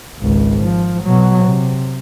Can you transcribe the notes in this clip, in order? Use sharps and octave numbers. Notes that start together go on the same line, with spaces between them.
G#1 C#2
F3
B2 F#3
C3